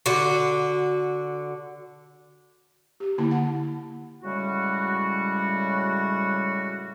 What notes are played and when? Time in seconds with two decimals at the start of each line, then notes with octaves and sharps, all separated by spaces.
0.06 D3 F#4
3.00 G4
3.18 D3 A#3 E4 A5
3.31 F#5 A5
4.22 A2 C#3 G3 G#3 F#4